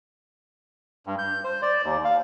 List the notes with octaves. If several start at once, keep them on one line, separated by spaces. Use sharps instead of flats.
G2
G6
C5
D5
D#2
F5